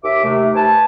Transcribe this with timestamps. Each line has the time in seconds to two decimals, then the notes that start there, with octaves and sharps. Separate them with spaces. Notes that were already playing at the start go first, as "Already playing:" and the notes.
0.03 D#2 E5 D6
0.24 D#2 C3 A3
0.55 B4 C5 G#5 A5